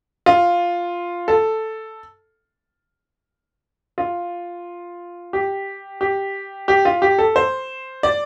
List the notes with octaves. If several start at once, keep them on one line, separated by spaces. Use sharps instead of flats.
F4
A4
F4
G4
G4
G4
F4
G4
A4
C5
D5